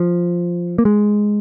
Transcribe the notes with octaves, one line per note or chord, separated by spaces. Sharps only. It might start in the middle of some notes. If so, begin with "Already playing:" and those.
Already playing: F3
A#3
G#3